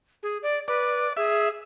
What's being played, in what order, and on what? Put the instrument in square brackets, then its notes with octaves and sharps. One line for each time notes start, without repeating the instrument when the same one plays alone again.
[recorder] G#4
D5
[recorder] B4 [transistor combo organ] D5
[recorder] G#4 [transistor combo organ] E5